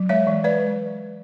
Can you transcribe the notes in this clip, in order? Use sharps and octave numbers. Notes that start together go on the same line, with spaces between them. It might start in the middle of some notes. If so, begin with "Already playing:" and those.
Already playing: F#3
G#3 C#5 E5
E3
G#3 B4 D5